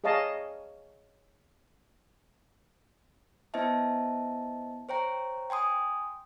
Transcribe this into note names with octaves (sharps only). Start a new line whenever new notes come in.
G#4 C#5 D#5 F5 A5
B3 E4 C5 D#5 E5 A5
C5 C#5 G5 A#5
G5 G#5 C6 D#6